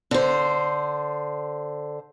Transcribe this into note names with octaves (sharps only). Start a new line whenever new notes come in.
D3 C5